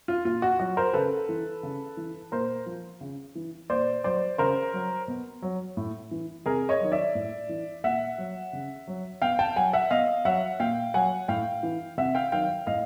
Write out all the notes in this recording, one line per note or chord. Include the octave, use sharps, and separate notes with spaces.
F4
A#2 F4
F#4
F#3 F#4
A#4 C5
C#3 A4 B4
E3
C#3
E3
A#2 A#4 C5
F3
C#3
E3
A#2 C5 D5
F#3 C5 D5
C#3 A#4 C5
F#3
B2
F#3
A2
E3
C3 G#4 A#4
C#5 D#5
D#3 F#3
D5 E5
A2
E3
A#2 E5 F#5
F#3
C#3
F#3
B2 F5 G5
G5 A5
F#3 F#5 G#5
E5 F#5
B2 D#5 F5
F#3 E5 F#5
A#2 F5 G5
F#3 F#5 G#5
A2 F5 G5
E3
C3 E5 F#5
F5 G5
D#3 F#3 F5 G5
A2 D#5 F5